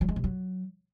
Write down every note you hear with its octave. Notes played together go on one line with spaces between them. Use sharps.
F#3
G#3
C3
F#3